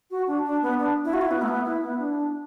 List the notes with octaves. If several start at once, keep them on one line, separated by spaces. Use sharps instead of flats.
F#4
D4
D4
B3
D4
E4
F#4
E4
B3
A3
B3
E4
B3
D4